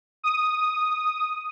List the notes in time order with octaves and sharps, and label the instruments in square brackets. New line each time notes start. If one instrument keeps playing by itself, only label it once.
[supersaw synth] D#6